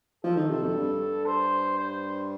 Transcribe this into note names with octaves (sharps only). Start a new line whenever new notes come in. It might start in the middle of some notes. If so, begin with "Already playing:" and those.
F3 A4
D#3
C3
F2
G2
C5
C5